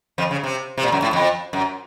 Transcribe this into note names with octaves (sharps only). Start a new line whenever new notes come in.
F2 F3
C#3
C3
C3
A#2
F#2
A2
F2
F#2